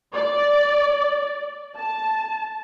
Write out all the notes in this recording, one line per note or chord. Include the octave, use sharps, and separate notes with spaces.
D5
A5